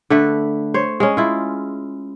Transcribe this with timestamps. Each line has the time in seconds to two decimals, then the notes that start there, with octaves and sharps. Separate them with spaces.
0.10 D3 A3 B4
0.74 C5 C#5
1.00 G#3 C#4
1.17 E4 F4